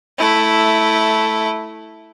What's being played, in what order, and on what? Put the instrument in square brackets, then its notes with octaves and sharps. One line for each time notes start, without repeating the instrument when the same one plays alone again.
[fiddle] A3 E4